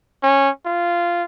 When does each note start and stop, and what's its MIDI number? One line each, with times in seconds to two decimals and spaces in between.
0.23 0.49 61
0.66 1.24 65